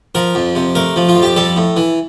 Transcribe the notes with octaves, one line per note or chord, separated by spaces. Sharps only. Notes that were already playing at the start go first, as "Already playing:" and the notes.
F3 A#4
F2
C3
A3 A#4
F3
F4
F2
G4
G3 A4
A2
E3